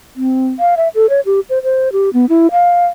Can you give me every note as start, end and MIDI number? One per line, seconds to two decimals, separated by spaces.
0.16 0.49 60
0.59 0.75 77
0.77 0.88 76
0.95 1.09 69
1.10 1.20 73
1.26 1.40 67
1.50 1.63 72
1.63 1.92 72
1.92 2.10 67
2.13 2.26 59
2.29 2.47 64
2.52 2.87 77